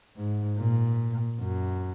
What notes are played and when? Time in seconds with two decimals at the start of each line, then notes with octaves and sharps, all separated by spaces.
0.17 G#2
0.58 A#2
1.40 F#2